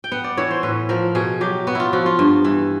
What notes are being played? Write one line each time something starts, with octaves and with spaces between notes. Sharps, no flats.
G5
B3 F#5
D5
E3 C#5
C5
A2 B4
F3 A#4
B2 G#4
F#3 G4
B3 F#4
E4 F4
F3 F#4
F4
G2
E3